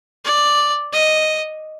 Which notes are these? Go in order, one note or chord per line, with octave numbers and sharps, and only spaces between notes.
D5
D#5